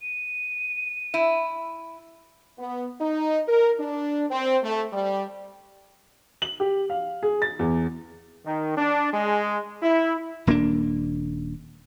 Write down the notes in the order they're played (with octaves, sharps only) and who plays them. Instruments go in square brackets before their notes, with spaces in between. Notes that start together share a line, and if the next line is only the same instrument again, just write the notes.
[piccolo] D#7
[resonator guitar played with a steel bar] E4
[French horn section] B3
D#4
A#4
D4
C4
A3
G3
[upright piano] F#7
G4
F5
G#4
A6
E2
[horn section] D#3
D4
G#3
E4
[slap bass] D#1 A#3 C#4 D4